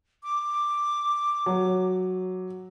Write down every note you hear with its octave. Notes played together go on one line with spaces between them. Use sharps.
D6
F#3